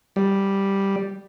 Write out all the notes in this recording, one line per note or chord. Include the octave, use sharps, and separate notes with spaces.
G3